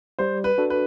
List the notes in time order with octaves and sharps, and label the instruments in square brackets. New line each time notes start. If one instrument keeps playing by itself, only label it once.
[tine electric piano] G3 [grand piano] C5
[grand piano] B4
[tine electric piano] D4 F#4 A4
[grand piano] B4